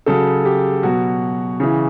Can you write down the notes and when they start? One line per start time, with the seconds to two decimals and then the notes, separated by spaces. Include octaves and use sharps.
0.06 C#3 F#3 A4
0.45 G4
0.83 B2 F#3 F#4
1.60 C#3 E3